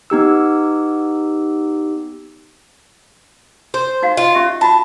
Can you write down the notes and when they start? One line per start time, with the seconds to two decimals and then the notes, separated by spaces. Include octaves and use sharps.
0.10 B3 D#4 G4 E6
3.74 C5
4.02 D#4 F#4 F5
4.17 F4 D#5
4.34 C#4 G4 E5
4.61 F4 F#4 A5 B5